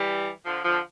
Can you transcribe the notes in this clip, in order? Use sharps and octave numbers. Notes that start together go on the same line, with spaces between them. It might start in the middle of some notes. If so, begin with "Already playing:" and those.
Already playing: E3 G3
D3 F3
D3 F3